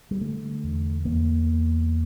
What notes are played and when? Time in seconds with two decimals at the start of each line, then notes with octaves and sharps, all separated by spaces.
0.11 G3
0.21 D3 A3
0.64 E2
1.05 E2 A#3